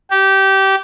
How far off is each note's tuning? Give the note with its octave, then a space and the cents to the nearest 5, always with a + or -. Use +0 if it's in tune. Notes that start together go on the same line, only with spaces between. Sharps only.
G4 -20